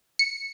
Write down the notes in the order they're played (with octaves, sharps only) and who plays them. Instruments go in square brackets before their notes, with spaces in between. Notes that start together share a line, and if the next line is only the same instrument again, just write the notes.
[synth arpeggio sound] C#7